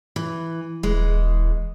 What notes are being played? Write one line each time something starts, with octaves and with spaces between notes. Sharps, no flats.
E3
D#1 E3 G#3